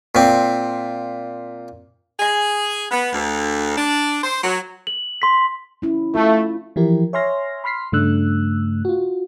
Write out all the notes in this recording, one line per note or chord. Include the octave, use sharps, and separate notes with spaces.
A#2 C4
G#4
B3
D2
D4
C5
F#3
F#7
C6 B6
C#4 E4
A3 E4 F4
E3 F3 E4 G4 A#4
C#5 E5 G#5 C6 F6 A#6
B5 C6 F6 B6 C7
G2 C#3 A3 D4 E6 F#6
F4 F#4